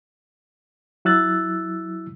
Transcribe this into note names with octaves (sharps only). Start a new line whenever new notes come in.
F#3 E4 E6 F#6 A6